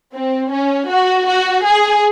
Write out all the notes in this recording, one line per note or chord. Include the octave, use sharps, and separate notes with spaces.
C4
C#4
F#4
F#4
G#4